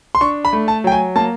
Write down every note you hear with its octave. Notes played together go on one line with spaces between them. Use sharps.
C6
D4 C#6
B5
A3
A5
F#3 G5
G#5
A#3 A5